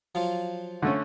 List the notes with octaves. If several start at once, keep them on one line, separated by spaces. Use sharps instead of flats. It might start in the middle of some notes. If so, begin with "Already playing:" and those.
F3 F#3 F4
D3 A3 C#4